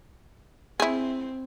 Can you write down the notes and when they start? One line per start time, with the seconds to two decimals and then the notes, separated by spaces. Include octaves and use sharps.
0.80 C4 E4 G#4